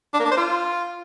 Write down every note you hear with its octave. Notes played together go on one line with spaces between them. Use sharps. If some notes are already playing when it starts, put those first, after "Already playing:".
D4
A#3
D4
C5
F4